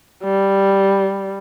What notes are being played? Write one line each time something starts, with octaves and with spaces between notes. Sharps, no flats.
G3